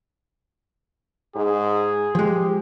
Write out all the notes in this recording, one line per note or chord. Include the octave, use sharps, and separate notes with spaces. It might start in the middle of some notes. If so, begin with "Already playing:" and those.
G#2 G#4
F3 G#3 G4